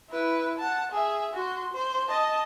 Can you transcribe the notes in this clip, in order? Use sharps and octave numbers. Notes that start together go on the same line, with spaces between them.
E4 B4
F#5 A5
G#4 E5
F#4 C6
C5
D#5 A5